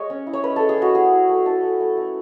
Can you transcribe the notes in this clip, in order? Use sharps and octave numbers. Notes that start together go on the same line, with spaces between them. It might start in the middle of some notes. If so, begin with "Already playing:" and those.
Already playing: G#3 C#5 D#5
C#4
E4
C#5
C#4 B4
G#3 A4
G#4
G#3 F#4
E4 G#4
E4
A3
E4 A4
A3
A3
A3